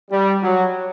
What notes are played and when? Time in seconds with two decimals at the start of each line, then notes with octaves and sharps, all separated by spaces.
0.11 G3
0.42 F#3